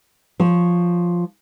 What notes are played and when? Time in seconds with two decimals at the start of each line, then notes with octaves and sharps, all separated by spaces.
0.40 F3 C#5